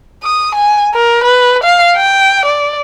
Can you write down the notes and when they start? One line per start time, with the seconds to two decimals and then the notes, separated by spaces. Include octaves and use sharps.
0.24 D#6
0.55 G#5
0.94 A#4
1.24 B4
1.64 F5
1.96 G5
2.45 D5